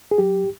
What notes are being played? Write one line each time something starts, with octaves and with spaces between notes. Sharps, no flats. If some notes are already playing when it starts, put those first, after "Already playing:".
G#4
F#3 G4